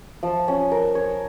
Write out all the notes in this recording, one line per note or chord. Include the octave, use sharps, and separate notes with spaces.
F3
C#4
A#4
C#5